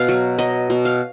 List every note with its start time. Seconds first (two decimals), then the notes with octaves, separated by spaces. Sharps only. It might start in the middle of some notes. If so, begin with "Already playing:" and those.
Already playing: B2 B4 F5
0.08 F#3
0.39 F#3 D#5
0.70 B2
0.85 F5